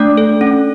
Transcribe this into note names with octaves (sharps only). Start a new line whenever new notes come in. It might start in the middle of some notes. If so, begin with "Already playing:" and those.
Already playing: A3 D4 D5
A4
C#4